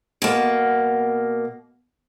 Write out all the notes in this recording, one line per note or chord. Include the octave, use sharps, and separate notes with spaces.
B2 A#3